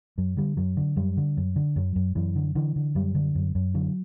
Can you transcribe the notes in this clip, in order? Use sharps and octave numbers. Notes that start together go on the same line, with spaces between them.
F#2 F#3
D3 G3
F#2 F#3
D3
F#2 G3
D3
F#2
D3
F#2 F#3
F#2
F#2 E3
D3
D3 E3
D3
F#2 G3
D3
F#2
F#2
D3 F#3